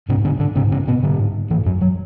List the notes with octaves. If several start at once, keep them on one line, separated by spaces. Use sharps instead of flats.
G#2 C#3 C#4
D3 D4
D3 D4
G#2 C#3 C#4
C#3 C#4
B2 B3
G#2 D3
G#2 E3
F#2 F#3
F#3